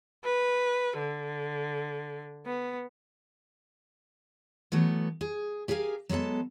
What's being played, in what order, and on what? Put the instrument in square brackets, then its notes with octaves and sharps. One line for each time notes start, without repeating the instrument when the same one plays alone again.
[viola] B4
D3
B3
[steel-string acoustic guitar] E3 F#3 A3 B3
G#4
G4 G#4 A#4 F5 G#5
F#3 G#3 B3 A4 A5